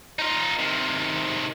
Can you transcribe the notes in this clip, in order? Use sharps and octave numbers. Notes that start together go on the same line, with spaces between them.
D#4 F4
C3 D#3